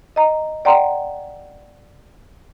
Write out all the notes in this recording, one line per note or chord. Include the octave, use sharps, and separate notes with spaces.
D#5 A#5
D5 F#5 G5 A#5 C6